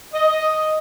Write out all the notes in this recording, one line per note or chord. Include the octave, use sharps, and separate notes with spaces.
D#5